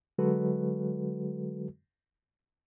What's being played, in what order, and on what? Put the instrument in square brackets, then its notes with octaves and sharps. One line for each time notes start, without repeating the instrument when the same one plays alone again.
[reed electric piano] D3 F#3 G#3 F#4 A4 B4